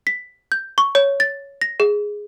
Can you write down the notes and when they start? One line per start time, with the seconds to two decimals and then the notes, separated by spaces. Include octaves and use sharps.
0.07 B6
0.52 G6
0.78 C#6
0.95 C#5
1.20 A6
1.62 A#6
1.80 G#4